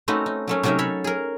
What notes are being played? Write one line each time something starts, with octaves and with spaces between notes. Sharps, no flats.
A3 C4 C#4 D#4 F#4 B4
D#4
F#3 A3 C#4
C3 F#3 C#4 D#4 A#4 E5
A4 C#5 B5
G#4 A#4